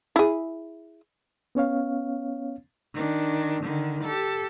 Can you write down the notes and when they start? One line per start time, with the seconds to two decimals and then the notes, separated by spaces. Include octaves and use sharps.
0.16 E4 G#4
1.55 B3 C#4 C#5 F5
2.94 D#3 D4
3.63 D3 D#3
4.04 G4 A4